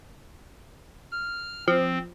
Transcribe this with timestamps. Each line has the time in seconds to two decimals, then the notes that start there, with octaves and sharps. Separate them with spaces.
1.12 F6
1.68 F3 C4